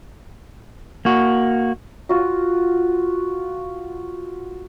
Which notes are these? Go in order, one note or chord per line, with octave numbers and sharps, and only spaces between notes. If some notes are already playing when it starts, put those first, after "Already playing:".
A#3 F#4
F4 F#4